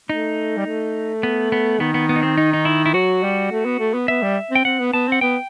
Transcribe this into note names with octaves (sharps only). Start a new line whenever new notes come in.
A3 D#4
G3
A3
B3
B3
D#3 B3
B3
B3
D#4
C4
D#4
D#4
E4
E4
F#3 F#4
G3
A3
B3
A3
B3
B3 E5
G3
C4 G5
C4 F#5
B3
B3 A5
C4 F#5
B3 G5